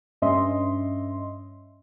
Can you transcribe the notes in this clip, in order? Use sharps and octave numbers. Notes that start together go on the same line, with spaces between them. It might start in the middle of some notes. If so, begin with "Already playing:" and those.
G2 C#4 D#5 E5 C6